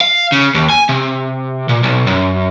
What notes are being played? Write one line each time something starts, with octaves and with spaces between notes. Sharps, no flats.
F5
C#3
D#2
G#5
C3
A#2
B1
F#2